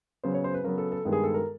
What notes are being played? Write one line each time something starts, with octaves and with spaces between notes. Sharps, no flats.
C#3 F#3 B3 C5
C#5
C5
B4
C#3 F#3 B3 A#4
A4
A4
G2 D#3 G#3 B3
G#4
A4
A#4